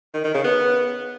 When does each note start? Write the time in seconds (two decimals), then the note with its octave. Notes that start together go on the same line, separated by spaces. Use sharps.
0.15 D#3
0.25 D#3
0.35 C#3
0.45 B3